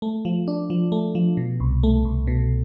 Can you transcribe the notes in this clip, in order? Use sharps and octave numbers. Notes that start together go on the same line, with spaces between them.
A3
F3
D4
F3
A3
F3
B2
C2
A3
C2
B2